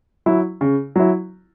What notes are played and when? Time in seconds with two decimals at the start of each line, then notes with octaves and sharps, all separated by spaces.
0.26 F#3 E4
0.61 C#3
0.96 F#3 E4